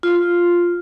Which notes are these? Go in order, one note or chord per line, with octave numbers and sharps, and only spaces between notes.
F4